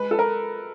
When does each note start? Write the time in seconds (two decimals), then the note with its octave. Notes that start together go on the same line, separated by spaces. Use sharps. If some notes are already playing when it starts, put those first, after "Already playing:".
Already playing: G#3 B4
0.11 A4
0.19 A#4